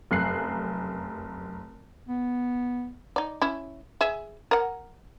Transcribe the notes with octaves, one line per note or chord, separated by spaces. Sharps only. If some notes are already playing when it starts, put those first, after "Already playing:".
F1 F#2 F#6 C7
B3
D#4 D5
C#4 E4
G#4 E5
A#4 F#5